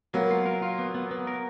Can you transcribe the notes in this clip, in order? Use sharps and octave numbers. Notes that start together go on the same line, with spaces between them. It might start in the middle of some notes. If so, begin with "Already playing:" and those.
F#3 A#3 B3
F4
A#4
F4
B3
B3
B3
A#4